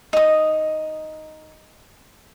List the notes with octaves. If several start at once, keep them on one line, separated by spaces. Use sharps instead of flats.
D#4 D#6